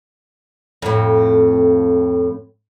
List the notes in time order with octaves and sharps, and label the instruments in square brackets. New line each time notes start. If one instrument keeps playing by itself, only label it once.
[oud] F2 A2